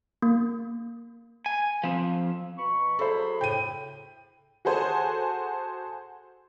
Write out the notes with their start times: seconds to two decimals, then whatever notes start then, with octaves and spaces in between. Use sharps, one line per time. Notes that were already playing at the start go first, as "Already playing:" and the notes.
0.22 A#3
1.46 G#5
1.84 F3 C4
2.58 B2 B5 C#6
2.99 F#3 G#4 A4 C5 B5
3.41 A2 C#3 G5 D#7
4.65 F#4 G#4 A4 C5 F#5 G#5